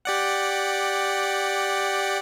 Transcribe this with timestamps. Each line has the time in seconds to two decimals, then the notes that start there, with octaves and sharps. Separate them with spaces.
0.05 G4 D5 F#5